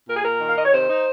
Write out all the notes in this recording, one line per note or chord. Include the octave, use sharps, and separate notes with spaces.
A#2 A#4
G#4
A#2 A#4
D#3
F5
D#3 D#5
C#5
C3 C5
D#4